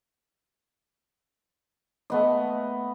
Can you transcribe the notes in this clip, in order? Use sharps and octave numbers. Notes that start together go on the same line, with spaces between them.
A3 B3 D#5